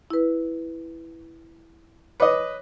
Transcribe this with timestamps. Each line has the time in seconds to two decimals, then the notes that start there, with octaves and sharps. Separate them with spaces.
0.10 E4 B4
2.20 B4 C#5 D#5 D6